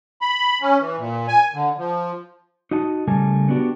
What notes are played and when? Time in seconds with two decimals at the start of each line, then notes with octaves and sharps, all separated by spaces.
0.22 B5
0.62 C#4
0.80 E3
0.98 A#2
1.28 G#5
1.54 D3
1.78 F3
2.71 D#4 F#4 D#5 A5
3.07 C#3 G3 A3 A#4 G#5 A5
3.48 A3 B3 C#4 D4 F#4 G4